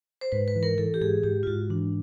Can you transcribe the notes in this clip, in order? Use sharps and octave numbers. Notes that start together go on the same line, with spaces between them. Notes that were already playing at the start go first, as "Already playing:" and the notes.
C5
G#2 B4
B4
E3
A#4
E3 A4
G4
G#2 G#4
G#2 G4
F4
G#2 F#4
E3 D4